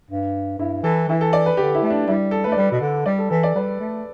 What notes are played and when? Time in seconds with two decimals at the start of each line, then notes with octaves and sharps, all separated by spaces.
0.10 G2
0.59 G2 E4
0.83 E3 A4
1.08 E3 E4
1.21 A4
1.33 D5
1.46 B4
1.57 D3 G4
1.74 E4
1.82 A3
1.90 D4
2.08 G3 E4
2.31 A4
2.44 B4
2.47 A3
2.52 D5
2.57 G3 B4
2.71 B2
2.81 D3
3.06 G3 D5
3.18 A4
3.30 E3 A4
3.43 D5
3.55 G3 B4
3.80 A3